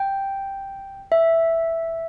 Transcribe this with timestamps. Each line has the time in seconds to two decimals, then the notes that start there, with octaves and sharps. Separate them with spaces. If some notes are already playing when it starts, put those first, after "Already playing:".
Already playing: G5
1.12 E5